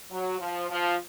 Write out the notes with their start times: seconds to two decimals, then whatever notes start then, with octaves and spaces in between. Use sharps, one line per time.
0.11 F#3
0.40 F3
0.70 F3